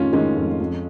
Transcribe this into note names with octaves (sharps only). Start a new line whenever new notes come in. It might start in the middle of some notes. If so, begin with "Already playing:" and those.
Already playing: F2 D#3 C#4 F4
D#3 G#3 C#4
F2
F2